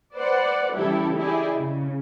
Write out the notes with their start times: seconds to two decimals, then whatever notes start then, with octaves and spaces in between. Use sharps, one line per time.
0.14 B4 C5 D5 F#5
0.75 C#3 E3 G3 E4 G4 A4
1.17 E4 G4 G#4 D5 D#5
1.57 C#3